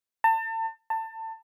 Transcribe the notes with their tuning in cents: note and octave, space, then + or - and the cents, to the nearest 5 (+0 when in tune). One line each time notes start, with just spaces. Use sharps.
A5 +35
A5 +25